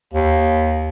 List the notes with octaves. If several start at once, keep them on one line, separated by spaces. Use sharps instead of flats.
D#2